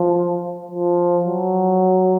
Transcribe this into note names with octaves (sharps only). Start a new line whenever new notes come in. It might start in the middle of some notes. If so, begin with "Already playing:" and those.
Already playing: F3
F3
F#3